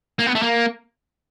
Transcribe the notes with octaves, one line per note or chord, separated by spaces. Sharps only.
A#3
B3
A3
A#3